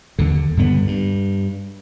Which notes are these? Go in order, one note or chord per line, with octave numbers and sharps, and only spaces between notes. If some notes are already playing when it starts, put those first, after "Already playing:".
D#2 D3
G2 D3 B3
G2